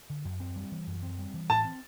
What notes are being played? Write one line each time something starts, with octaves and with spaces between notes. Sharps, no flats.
D3
F#2
C4
G3
E3
F#2
C4
G3
E3
A2 A5
C4